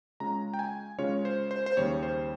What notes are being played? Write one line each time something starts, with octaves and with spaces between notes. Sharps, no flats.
C#3 G#3 C#4 F4 A#5
G5
G#5
C#3 G#3 C#4 F4 C#5
C5
C5
C5
D#2 C#3 G3 C#5
C5